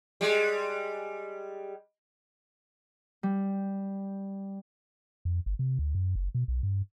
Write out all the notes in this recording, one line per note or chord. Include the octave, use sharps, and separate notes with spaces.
G3 G#3
G3
F2
G1
C3
D2
F#2
F#1
B2
B1
G2